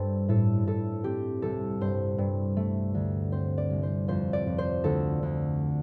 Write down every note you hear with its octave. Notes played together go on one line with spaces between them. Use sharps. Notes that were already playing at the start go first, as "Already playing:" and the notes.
Already playing: G2 A4 C5
A2 A4
A2 A4
C4 G4
C2 A4
G2 C5
G2
A3
D2
C4 C5
D5
C2
C5
F2 C5
D5
F2
C5
D2 A4
D2